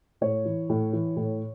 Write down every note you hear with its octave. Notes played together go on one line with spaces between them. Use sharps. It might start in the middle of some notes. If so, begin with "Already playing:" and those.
A2 C#5
E3
A2
E3
A2